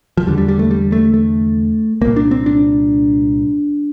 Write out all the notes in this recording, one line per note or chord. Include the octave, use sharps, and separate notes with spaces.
F3
E2 D3 G3
G3
G3
A3
G3
A3
A3
C2 A#2 A#3
D4
C4
D4